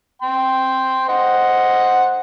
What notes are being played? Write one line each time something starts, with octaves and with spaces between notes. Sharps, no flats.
G5 C6
C5 D#5 F#5